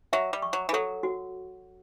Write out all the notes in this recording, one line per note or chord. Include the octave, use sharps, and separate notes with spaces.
F#3 E5
G3
C#6
F#3
E3
F#3 A4
F#4